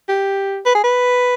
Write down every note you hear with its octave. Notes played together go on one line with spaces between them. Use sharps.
G4
B4
G#4
B4